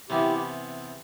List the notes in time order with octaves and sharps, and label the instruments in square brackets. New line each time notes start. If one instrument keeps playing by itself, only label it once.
[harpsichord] C3 E3 B3 [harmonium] E4 G4